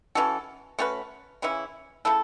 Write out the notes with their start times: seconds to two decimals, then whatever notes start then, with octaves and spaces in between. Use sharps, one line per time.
0.15 E3 C#4 F#4 A4
0.79 A3 C#4 F#4 B4
1.42 C#3 E3 C#4 E4
2.05 C#3 A3 E4 A4